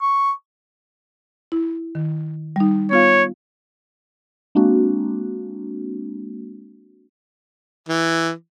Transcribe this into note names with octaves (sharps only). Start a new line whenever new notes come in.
C#6
E4
D#3
G3 D#4
B3 F4 C#5 F5
G#3 A#3 C4 D4 F#4
E3